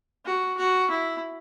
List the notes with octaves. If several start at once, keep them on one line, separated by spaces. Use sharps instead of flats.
F#4
F#4
E4